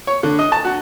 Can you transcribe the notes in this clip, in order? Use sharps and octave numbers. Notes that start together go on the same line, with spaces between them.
C#5
D3
D#5
A5
F#4